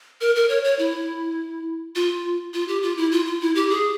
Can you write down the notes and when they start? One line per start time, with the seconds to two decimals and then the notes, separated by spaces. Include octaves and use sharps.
0.21 A#4
0.35 A#4
0.49 C#5
0.64 C#5
0.79 E4
1.95 F4
2.54 F4
2.68 G4
2.82 F4
2.97 E4
3.12 F4
3.26 F4
3.41 E4
3.55 G4
3.70 G#4